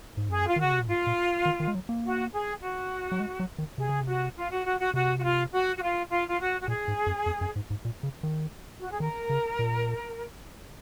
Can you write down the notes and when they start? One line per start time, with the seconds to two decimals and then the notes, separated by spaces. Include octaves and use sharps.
0.17 G#2
0.29 F#2 G#4
0.47 F4
0.56 D#3 F#4
0.64 C#3
0.72 C3
0.80 A#2
0.87 G#2 F4
1.07 A#2
1.46 D#3
1.60 D#3
1.68 G#3
1.75 F#3
1.89 A#3
2.04 F#4
2.32 G#4
2.62 F#4
3.12 F#3
3.20 G#3
3.40 F#3
3.58 D#3
3.78 C3 G#4
3.89 C#3
4.01 C3
4.07 F#4
4.36 F4
4.51 F#4
4.66 F#4
4.79 F#4
4.94 C3 F#4
5.17 F#4
5.23 F4
5.51 F#4
5.76 F#4
5.81 F4
6.10 F4
6.28 F4
6.40 F#4
6.61 F#4
6.68 A#2 G#4
6.88 G#2
7.06 F#2
7.26 F2
7.41 F#2
7.56 G#2
7.70 G#2
7.85 A#2
8.03 C#3
8.23 D#3
8.82 F#4
8.91 G#4
9.00 D#3 A#4
9.30 C#3
9.59 A#2